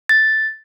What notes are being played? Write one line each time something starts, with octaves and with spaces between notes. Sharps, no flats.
A6